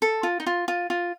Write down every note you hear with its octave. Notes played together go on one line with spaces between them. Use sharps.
A4
F4
D#4
F4
F4
F4